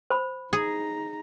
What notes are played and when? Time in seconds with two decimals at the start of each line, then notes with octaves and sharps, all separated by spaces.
0.10 C5 B5
0.53 D#4 G#4 A#5